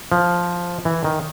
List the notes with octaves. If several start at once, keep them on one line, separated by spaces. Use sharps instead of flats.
F3
E3
D#3